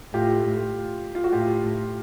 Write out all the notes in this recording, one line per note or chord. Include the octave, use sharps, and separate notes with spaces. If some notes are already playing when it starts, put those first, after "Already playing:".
A2 F4 G4
F4
F#4
A2 F4 G4